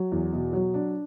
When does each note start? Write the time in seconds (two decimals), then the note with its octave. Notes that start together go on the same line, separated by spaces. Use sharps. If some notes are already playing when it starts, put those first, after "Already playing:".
Already playing: F#3
0.12 E2
0.33 B2
0.53 F#3
0.74 D4